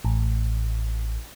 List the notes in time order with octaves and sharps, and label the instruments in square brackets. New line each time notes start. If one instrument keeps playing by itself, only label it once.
[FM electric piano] A1